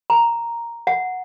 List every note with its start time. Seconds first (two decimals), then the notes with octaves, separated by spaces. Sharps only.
0.10 A#5
0.87 F#5